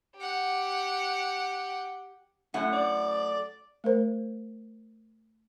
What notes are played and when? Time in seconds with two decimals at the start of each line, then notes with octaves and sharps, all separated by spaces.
0.16 G4 F#5
2.54 F#2 A2 A3 F#5
2.73 D5
3.84 A3 A#4 C5